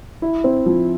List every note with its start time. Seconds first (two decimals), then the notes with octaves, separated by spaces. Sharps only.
0.22 E4
0.44 C4
0.66 F3